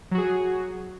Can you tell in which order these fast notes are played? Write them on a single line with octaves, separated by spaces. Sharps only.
F#3 F#4 G#4